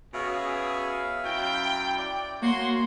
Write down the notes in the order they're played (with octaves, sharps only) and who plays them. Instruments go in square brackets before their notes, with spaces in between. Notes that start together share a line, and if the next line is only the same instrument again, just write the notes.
[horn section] B2 C#4 G#4 [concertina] E5 F5
[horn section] F#2 E4 G5
[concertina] D5
[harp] A#3 [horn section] F#4 C6 [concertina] C#5